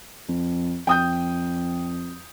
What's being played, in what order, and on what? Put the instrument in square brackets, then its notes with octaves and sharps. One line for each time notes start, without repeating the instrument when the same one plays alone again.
[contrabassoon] F2
[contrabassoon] F2 [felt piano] G5 D#6 G6